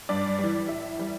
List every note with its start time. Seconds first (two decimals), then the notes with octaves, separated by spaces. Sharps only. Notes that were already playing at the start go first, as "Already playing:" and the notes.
0.09 G2 D5
0.39 E3 G3
0.69 A2 E5
0.98 E3 G3